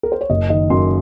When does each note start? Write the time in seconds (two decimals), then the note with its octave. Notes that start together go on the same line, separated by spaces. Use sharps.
0.03 A#4
0.12 C5
0.21 C#5
0.30 F#1 D#5
0.50 D#3 D#5
0.70 F#2 C6